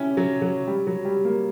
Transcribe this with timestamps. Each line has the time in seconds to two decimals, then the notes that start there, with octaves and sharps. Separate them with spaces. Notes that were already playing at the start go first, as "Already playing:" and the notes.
Already playing: C#4 E4 G4
0.17 F#3
0.42 F#3
0.67 G3
0.87 F#3
1.05 G3
1.25 A#3